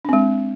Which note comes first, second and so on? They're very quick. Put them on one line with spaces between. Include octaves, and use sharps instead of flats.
D4 C4 G#3